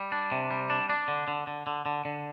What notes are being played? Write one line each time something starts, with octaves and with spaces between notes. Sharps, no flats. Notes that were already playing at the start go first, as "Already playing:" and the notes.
Already playing: G3
D4
C3
G3
D4
D4
D3
D3
D3
D3
D3
D3